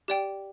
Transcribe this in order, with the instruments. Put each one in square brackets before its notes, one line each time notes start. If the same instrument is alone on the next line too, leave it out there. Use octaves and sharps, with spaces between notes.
[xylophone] G4 D5 G5